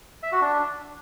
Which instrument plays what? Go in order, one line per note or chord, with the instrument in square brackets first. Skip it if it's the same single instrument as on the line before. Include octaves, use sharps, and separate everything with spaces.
[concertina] E5
F#4
D4